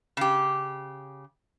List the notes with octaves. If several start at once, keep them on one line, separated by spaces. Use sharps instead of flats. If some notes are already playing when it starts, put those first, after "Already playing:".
C#3 G4